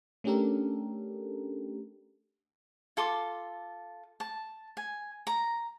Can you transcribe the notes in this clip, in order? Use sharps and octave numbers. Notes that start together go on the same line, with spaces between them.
A3 C#4 D4 G4 A4 A#4
F4 A4 C6 D6
A5
G#5
A#5